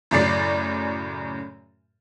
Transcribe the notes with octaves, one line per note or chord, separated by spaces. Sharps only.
F#2 A2 C#3 D5 A6 C7